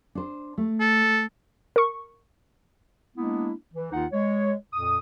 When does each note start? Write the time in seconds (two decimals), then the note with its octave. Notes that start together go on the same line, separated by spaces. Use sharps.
0.15 D4 C5
0.58 A3
0.80 A4
1.76 A#4 C#6
3.16 G#3 A#3 B3 D4 E4
3.73 E3
3.92 D#2 D#3 D#4 F4 F#5
4.12 G#3 C#5
4.73 F2 A#2 D#6